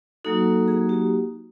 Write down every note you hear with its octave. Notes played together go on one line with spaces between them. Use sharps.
F#3 A#3 D#4 F#4 A4
G#4
G4